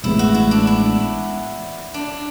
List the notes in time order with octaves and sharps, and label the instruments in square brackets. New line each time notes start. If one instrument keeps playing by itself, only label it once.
[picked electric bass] A1 A2 G#3 B3 [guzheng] E4
[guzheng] F#4
E4
D4
E4
D4